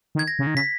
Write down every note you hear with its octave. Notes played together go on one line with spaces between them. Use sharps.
D#3
G#6
A#6
C#3
D#3
C#3 B6